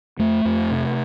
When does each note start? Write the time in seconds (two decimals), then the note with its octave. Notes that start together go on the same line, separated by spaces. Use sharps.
0.19 F2 A3
0.45 F2
0.71 C3